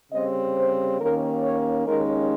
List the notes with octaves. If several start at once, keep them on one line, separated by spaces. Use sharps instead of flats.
C#3 G3 C4 D#5
C5
D#2 D#3 A#3 C#4 A#4
C#5
D#2 D#3 G#3 C#4 A#4